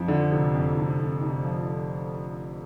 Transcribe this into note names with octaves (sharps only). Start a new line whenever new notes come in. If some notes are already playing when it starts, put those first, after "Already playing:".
Already playing: F2 F3
D3
F1
F2
F1
F1
F1
F3